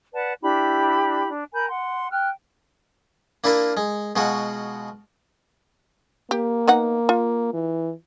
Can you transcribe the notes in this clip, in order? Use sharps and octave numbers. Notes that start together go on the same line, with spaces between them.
B4 D5 F#5 A5
D4 E4 G4 B5
D4
A#4 G#5 B5 G6
F#5 C6
G5 F6 F#6
A#3 D4 E4 F4 A#4
G#3
B2 G#3 F4 F#4
A#3 G4
B3 D#4 F#5
F4
E3